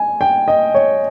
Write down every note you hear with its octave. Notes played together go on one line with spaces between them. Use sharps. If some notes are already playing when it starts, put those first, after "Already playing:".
Already playing: G#5
G5
D#5
C#5